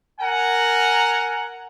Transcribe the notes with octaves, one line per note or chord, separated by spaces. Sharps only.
A#4 F#5 G#5 A#5